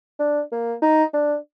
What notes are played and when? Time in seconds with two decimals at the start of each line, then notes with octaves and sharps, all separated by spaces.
0.19 D4
0.52 A#3
0.82 D#4
1.13 D4